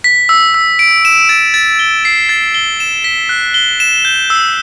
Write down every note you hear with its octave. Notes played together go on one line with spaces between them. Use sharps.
B6
E6
E6
D7
E7
A6
A6
G7
C7
A6
G7
E7
B6
F#6
G7
E7
G6
E6